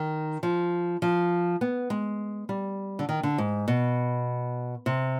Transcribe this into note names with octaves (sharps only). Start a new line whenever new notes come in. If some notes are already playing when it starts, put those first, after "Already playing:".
Already playing: D#3
F3
F3
B3
G#3
G3
D3
D#3
D3
G#2
B2
C3